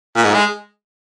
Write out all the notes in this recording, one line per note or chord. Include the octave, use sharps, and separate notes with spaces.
A#2
G#2
G#3